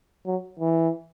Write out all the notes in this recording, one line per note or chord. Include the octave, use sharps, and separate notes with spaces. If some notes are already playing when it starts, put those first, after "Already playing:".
F#3
E3